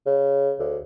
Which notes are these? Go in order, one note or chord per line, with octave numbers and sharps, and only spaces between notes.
C#3
D2